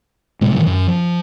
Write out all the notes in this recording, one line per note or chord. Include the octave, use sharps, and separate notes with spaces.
A2 C3 G#3
A2 D#3 E3 G3
F#2
F3